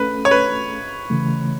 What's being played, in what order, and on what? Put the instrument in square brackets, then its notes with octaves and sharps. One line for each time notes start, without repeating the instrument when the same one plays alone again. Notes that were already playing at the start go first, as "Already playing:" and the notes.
Already playing: [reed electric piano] A3 C#4 A4 [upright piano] B4
[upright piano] C#5
B4
[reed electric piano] C#3 E3 A3